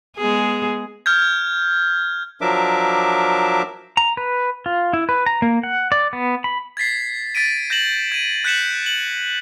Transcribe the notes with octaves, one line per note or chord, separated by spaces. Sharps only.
G#3 B3 G#4
F6 G6 G#6
F3 F#3 D4 A#4 E5 D6
A#5
B4
F4
E4
B4
A#5
A#3
F#5
D5
B3
B5
G#6 A6 B6 C7
A6 B6 D7 D#7
G6 A#6 E7 F#7
G#6 D#7
F#6 G6 B6 C#7 E7 F#7
F#7